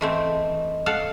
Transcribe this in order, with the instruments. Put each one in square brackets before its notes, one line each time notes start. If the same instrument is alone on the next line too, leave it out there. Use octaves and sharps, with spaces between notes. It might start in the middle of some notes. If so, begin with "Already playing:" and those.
[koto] E3 A3 C4 [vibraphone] D#5
[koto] A4 F5 F#5